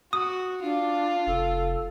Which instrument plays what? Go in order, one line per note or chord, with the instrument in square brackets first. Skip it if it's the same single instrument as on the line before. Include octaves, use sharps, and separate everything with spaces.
[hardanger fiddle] F#4 [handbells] D#6
[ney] D4 [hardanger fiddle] F4
[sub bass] F1 [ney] A4